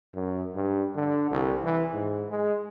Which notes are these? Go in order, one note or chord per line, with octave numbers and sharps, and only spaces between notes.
F#2
G2
D3
C2
E3
G#2
G#3